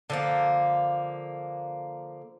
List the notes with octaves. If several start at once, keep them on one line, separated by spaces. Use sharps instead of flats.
D3 F3 A#3